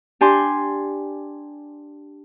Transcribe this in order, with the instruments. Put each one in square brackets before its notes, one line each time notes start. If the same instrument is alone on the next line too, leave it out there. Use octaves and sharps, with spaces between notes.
[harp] D4 G4 G#5 C6